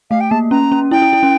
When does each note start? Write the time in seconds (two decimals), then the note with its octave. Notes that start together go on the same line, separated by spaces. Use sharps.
0.10 A3 F5
0.20 G5
0.31 A#3 A5
0.51 C#4 A#5
0.72 C#4
0.91 E4 G5
1.02 E4
1.13 E4
1.23 C#4